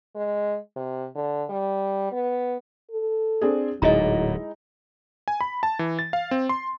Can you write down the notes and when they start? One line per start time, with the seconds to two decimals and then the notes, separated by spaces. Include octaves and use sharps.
0.16 G#3
0.76 C3
1.15 D3
1.50 G3
2.12 B3
2.91 A4
3.42 C4 D4 G#4
3.82 D1 A#2 F#3 G#3 D#4 E4 D#5 A#5
5.28 G#5
5.41 B5
5.63 A5
5.79 E3
5.99 A6
6.13 F5
6.31 C4
6.49 C6